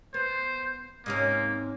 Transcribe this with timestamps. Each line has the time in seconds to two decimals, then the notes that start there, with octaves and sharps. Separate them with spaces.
0.14 B3 C5
1.06 G#2 C3 A#3 C#4